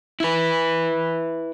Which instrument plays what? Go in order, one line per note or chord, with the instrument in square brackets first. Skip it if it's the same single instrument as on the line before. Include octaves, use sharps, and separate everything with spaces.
[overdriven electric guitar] E4 B4